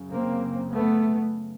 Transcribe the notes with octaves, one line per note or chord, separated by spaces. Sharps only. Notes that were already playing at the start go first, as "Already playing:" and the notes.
Already playing: F#2 C#3
A#3 C4
A3 B3